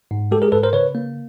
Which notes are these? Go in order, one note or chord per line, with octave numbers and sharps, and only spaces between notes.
G#2
G#3 G4 A4
G#4 A#4
G#2 A4 B4
A#4 C5
C#3 B4 C#5
A#3